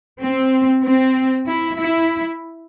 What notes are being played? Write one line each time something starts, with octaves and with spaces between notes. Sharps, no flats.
C4
C4
E4
E4